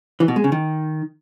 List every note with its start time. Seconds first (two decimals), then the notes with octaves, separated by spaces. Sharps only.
0.20 E3
0.28 B2
0.36 G#3
0.44 C#3
0.52 D#3